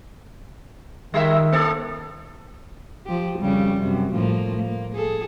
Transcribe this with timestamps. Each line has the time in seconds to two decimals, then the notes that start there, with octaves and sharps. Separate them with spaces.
1.14 D#3 G3 E5
1.53 A#3 A4
3.06 F3 G4
3.39 F2 C#3 G3
3.82 F#2 C3
4.14 A2 F3 A#3
4.62 A#3
4.95 G#4 A4